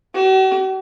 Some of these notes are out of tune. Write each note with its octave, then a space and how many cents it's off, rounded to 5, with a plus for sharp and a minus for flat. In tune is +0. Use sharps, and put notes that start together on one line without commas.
F#4 +45